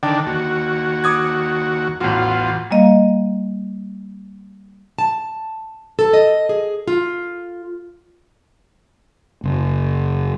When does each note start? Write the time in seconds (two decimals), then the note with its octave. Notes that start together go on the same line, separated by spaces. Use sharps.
0.03 D3 D#3 D4 G5
0.26 D#2 F#4
1.04 D6 D#6 G#6
2.00 A1 E2 F4 F#4
2.71 G3 A#3 D#5 F5
4.99 A5
5.99 A4
6.14 D#5
6.49 G#4
6.88 F4
9.44 F#1